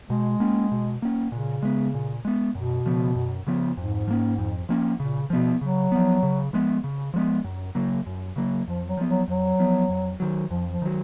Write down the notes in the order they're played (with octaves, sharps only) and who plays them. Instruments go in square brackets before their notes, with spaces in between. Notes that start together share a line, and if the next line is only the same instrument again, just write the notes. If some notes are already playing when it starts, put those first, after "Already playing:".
[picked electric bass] B2 [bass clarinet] G#3
[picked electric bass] A#3 C#4
B2
A#3 C#4
[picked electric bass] A#2 [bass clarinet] C#3
[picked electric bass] G#3 B3
A#2
G#3 B3
[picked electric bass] F#2 [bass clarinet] B2
[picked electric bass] C#3 F3 B3
F#2
C#3 F3 B3
[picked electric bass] F2 [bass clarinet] G#2
[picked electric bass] F3
A#3 C#4
F2
F3 A#3 C#4
[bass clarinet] A#2 [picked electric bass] C#3
[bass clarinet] B2 [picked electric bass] F3 B3
[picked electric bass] C#3 [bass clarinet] F#3
[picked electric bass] F3 B3
C#3
F3 G#3 B3
C#3
F3 G#3 B3
F#2
C#3 F#3 A#3
F#2
C#3 F#3 A#3
[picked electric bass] F2 [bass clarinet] F3
[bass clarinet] F#3
[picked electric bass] F3 B3
[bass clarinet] F#3
[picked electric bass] F2 [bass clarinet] F#3
[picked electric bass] F3 B3
F2
D#3 F#3
[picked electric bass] F2 [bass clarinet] F3
[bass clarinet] F3
[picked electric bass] D#3 F#3